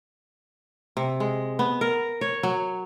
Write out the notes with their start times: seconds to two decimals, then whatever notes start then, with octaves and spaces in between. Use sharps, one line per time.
0.97 C3
1.20 G#3
1.59 B3
1.81 A#4
2.21 C#5
2.43 F#3